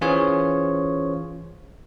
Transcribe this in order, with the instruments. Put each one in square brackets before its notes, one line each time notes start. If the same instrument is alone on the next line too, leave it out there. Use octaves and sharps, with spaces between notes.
[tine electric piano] E3 C#4 F4 G#4 C5 C#5